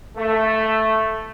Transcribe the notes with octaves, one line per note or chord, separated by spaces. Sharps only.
A3